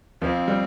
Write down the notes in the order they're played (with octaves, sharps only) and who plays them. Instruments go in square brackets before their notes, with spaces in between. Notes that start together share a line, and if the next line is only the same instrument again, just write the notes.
[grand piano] F2 F3 [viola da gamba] C4
[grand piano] G3